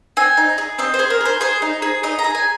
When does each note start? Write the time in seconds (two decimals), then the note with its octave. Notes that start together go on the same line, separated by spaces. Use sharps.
0.17 C4 G#5
0.37 D#4
0.58 G#4
0.79 C4 D#5
0.94 C5
0.99 G#4
1.10 A#4
1.21 G#4 C5
1.41 G#4 C5
1.62 D#4
1.82 G#4
2.03 D#4 D#5
2.19 A#5
2.24 G#4
2.35 G#5